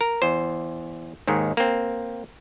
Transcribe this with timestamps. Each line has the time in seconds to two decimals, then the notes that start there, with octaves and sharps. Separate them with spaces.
0.01 A#4
0.22 E2 C5
1.27 D#2 G#2 D#3
1.57 A#3 C4